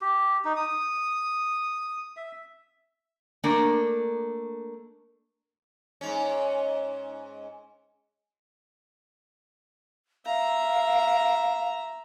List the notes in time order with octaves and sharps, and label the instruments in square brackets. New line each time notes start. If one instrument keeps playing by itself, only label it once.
[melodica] G4
D#4
D#6
E5
[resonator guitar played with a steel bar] A3 A#3 D4
[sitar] G#2 C#4
[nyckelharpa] E5 A#5 [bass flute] F5